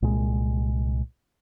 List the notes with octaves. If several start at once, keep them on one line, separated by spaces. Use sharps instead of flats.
C2 A#2 G#3